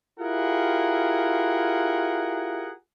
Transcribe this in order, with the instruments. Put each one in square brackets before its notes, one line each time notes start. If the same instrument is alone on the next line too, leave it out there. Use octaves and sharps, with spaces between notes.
[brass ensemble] E4 F4 G4 G#4 A#4 F#5